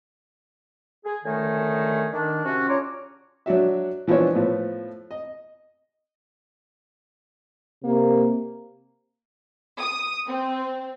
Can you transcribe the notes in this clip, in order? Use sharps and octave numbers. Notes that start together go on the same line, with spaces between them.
G#4
C#2 D3 D#3 A3 D#4 G#5
D#3 D4
C3 C#4 F#4
C#3 D4 F4 C#5 A#5 D6
F#3 D4 F#4 E5
E3 F3 B3 D4 C#5
A2 F3 B3
D#5
C3 A#3
D#6
C4